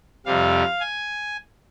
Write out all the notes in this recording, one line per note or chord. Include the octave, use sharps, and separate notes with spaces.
F2 C3 G3 F5
G#5